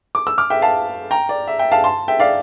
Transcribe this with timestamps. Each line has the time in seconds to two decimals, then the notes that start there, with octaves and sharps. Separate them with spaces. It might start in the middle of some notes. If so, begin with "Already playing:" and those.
0.15 D6
0.27 E6
0.38 D6 F6
0.50 E5 G5
0.62 F5 A5
1.11 G5 A#5
1.29 D5
1.47 E5
1.59 E5 G5
1.72 F5 A5
1.84 A5 C6
2.08 E5 G5
2.20 D5 F5